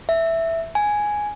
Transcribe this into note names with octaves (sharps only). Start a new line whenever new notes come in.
E5
G#5